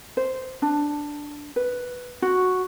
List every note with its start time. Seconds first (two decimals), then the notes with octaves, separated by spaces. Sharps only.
0.17 C5
0.62 D4
1.56 B4
2.22 F#4